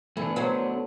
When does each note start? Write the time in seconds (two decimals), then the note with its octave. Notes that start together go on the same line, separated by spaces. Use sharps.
0.17 E3 A3 B3 D4
0.36 F#3 B4 C5